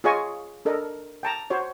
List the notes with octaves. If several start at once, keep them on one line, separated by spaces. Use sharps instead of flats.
F4 G#4 C#5 D#5 G#5 C#6
D4 A4 A#4 D#5
G5 A5 A#5
F#4 C5 C#5